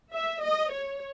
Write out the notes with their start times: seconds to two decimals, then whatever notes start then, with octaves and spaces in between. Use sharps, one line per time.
0.14 E5
0.43 D#5
0.72 C#5